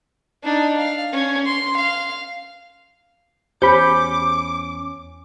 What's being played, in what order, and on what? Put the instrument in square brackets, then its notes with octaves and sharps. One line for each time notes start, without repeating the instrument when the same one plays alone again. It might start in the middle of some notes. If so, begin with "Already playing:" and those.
[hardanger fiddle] D4 D#4
F5
C#4
C6
F5
[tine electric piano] E2 C#4 C#7 [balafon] G4 C5 [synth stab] B5 G6 [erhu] D6